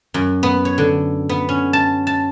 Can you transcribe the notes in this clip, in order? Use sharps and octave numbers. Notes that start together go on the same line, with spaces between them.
F#2
B3
C#5
D3
B3
C#4
A5
A5